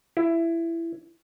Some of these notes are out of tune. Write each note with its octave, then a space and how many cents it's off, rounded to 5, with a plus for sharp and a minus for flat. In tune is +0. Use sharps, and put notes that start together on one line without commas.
E4 +15